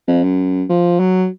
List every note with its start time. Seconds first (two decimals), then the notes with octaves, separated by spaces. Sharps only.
0.08 F2
0.23 F#2
0.69 F3
1.00 F#3